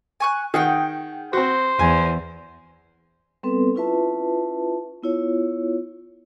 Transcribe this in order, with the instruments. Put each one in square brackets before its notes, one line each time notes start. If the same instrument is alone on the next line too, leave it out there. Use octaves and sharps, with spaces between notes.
[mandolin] G#5 C#6 F#6
[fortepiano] D#3 [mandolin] G#4 F#5 G5
[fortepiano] C4 F#4 [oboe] C5
[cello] E2 [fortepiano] G#5
[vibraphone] G3 B3 C4 A4 B4
C#4 E4 F4 B4 E5 A5
B3 E4 F4 C#5